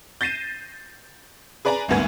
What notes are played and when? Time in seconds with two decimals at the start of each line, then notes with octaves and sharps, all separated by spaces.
0.21 G6 A6 A#6 C7 D#7 E7
1.65 G#4 B4 D5 G#5 A#5
1.88 G#1 D2 G2 B3 G#5 G#6